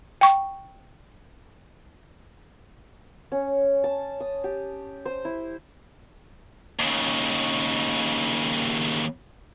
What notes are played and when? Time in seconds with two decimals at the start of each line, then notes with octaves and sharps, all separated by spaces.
0.21 G5 C#6
3.32 C#4
3.84 A5
4.20 D#6
4.44 G4
5.05 C5
5.25 E4
6.79 D#2 C#3